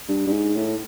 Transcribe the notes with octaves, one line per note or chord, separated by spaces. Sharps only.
G2
G2
G#2
A2